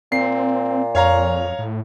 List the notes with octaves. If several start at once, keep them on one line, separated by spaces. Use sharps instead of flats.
A#2 C4 C7
F2 C#5 F5 A#5
A2